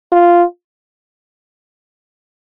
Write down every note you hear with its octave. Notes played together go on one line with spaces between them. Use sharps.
F4